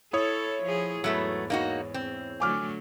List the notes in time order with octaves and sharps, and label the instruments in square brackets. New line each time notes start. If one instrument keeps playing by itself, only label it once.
[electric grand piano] E4 C#5 [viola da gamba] A4 [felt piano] D#6
[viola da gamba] F3 G#4
[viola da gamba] E2 G#2 [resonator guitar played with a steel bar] F#3 A3 B3 [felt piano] E6
[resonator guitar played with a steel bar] A#3 D#4 F#4
C4
[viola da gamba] D3 F#3 A3 [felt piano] G#5 D6 F6